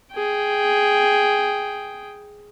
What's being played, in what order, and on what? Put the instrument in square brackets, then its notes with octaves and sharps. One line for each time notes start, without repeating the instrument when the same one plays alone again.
[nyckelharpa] G#4 G5